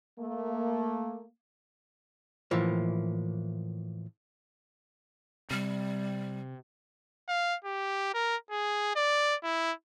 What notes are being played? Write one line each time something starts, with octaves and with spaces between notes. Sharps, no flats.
A3 A#3
A2 E3 F3 A#3
C3 G3
F5
G4
A#4
G#4
D5
E4